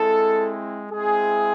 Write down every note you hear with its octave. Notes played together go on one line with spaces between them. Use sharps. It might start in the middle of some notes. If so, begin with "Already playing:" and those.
Already playing: G#3 C4 E4 A4
G#3 C4 E4 G#4